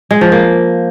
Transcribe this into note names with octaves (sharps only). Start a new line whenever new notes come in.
G#3
F3
A#3